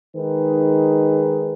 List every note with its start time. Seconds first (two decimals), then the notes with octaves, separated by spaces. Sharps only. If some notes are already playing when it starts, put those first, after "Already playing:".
0.16 D#3 G#3 D#4 G#4 B4